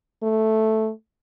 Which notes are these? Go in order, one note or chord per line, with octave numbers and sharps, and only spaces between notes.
A3